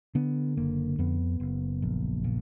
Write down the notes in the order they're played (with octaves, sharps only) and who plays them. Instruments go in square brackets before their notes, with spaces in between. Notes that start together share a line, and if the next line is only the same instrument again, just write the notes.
[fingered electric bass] D3 B3
F#1 A#3
F2 B3
F#1
A#1
A#2